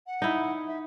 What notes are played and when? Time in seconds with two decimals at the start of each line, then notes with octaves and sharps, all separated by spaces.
0.07 F#5
0.22 D#4 E4
0.68 E5